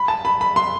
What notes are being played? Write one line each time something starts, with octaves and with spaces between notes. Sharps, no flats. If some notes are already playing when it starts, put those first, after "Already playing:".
Already playing: B5
A5
B5
B5
C6